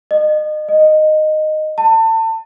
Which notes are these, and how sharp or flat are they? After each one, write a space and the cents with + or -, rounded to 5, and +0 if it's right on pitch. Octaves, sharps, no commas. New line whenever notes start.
D#5 -30
D#5 -10
A5 +30